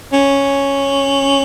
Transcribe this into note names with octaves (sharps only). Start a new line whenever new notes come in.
C#4